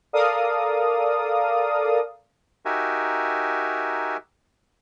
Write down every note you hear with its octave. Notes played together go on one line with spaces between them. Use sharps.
A4 A#4 D5 F5 D#6
D#4 F#4 G4 A#4 E5 G#5